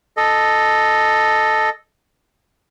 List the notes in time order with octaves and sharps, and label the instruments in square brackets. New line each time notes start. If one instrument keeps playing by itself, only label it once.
[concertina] A4 D#5